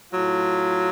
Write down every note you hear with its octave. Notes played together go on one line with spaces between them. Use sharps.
A2 F#3 F4